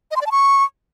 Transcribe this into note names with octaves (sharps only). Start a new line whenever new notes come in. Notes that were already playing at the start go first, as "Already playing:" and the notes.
D#5
C6
D5
A5
C#6